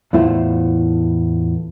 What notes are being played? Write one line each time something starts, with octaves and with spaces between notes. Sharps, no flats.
E2 A2 A3 E4 F4 C5